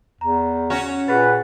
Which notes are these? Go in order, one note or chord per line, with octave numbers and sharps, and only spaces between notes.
E2 A#5
C#4 F#4
A#2 G#4 B4 F#5 A6